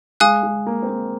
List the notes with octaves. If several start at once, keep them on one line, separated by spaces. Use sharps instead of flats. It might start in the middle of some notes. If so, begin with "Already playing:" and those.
G#3 F5 G#5 D#6 F#6
G#3
A#3
C4
A#3